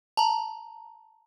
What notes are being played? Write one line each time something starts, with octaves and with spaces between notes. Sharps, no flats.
A5 A#5